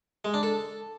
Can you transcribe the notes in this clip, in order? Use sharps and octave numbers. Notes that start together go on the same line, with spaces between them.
G#3
D4
A4